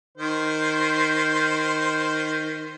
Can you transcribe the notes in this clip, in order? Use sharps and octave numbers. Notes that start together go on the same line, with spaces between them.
D#3 C5